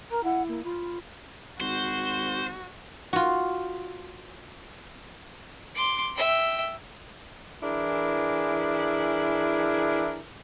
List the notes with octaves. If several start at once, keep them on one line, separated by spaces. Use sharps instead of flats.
A#4 A#5
E4 F#5
A#3
F4 B5
G#1 F#4 C5
F4 F#4
C6 D6
E5 G5
E3 D4 E4 G#4 A#4